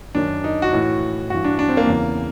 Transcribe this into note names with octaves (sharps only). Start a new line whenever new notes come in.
F#2 D#3 D4
D#4
F#4
A2 E3
G2 E3 F#4
D4
D4
C4
A#3
E2 C#3 E3